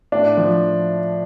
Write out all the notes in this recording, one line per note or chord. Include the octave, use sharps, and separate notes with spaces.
A2 D4
F3